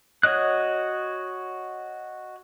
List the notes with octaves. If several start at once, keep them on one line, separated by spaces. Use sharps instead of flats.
F#4 C#5 D#5 F#6